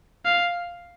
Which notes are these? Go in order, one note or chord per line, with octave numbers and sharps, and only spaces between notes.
F5